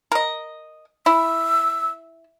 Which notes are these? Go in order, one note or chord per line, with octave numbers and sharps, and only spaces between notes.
A#4 D#5
E4 E6